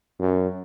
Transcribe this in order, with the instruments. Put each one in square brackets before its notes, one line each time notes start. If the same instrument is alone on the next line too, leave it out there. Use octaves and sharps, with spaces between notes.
[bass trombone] F#2